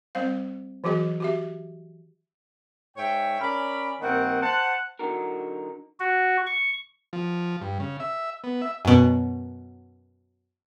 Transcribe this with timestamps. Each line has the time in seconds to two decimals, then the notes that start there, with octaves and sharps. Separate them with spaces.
0.15 G3 C4 C5 F5
0.84 E3 F#3 F#4 G#4 D#5
1.20 F#4 G4 E5
2.97 G#2 C#5 E5 G5
3.40 C#4 A#4 D5 B5
4.01 G2 D#3 A#3 C4 F#5
4.42 C5 F#5 A5
4.99 D3 F#3 D#4 F#4 A#4
6.00 F#4
6.47 C#6
7.13 F3
7.61 G2
7.80 C#3
8.00 E5
8.44 B3
8.62 E5
8.85 F#2 B2